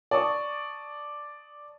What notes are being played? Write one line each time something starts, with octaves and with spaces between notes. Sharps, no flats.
D5 A5 C#6 D#6